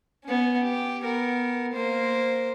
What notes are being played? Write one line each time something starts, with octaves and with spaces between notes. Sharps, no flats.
B3 C#4
G4
B3 A#4
A#3 C5